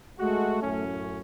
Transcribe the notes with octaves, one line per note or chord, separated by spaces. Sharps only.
G#3 A3 F#4
F#2 A2 C#4